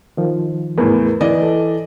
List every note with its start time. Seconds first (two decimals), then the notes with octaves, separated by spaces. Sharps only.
0.17 D#3 F3
0.78 E2 A2 G#4 A#4 B4
1.20 E3 D5 D#5
1.42 A4